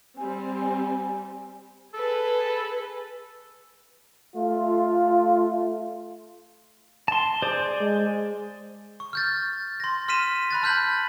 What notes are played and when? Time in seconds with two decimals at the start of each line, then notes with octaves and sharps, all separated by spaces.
0.17 G3 C4 G#5
1.94 G#4 A4 B4
4.36 A3 F4
7.08 A5 C6
7.42 G#4 C5 D5
7.81 G#3
9.00 C#6
9.13 F6 G6 A6
9.80 C6 A#6
10.08 C6 F6 B6 D#7 E7
10.51 B5 F#6 A6
10.63 A5 F6 G6 B6 F#7